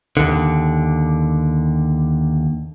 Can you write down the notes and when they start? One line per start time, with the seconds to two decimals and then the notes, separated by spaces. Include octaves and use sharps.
0.17 D#2 D3